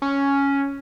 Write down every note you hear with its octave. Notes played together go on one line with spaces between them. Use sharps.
C#4